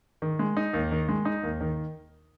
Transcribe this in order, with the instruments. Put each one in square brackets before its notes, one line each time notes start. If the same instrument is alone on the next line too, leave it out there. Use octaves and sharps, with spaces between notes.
[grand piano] D#3
G#3
D#4
D#2
D#3
G#3
D#4
D#2
D#3